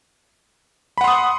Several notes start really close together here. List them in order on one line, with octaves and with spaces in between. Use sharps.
B5 F#5 C6 D#6